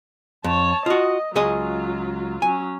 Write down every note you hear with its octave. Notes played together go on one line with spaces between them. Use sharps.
F2 C#5 A5
F4 F#4 D#5
C#2 F#3 F4 G#4 D#5
F#3 C#4 G#5